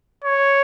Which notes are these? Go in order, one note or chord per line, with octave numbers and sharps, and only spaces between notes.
C#5